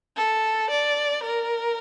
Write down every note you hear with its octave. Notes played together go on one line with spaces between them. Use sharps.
A4
D5
A#4